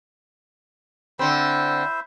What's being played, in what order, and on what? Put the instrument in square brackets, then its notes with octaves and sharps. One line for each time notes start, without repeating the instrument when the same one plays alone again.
[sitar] D3 C4 [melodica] E4 C5 E5